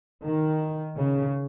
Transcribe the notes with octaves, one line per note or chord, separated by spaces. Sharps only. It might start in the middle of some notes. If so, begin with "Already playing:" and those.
D#3
C#3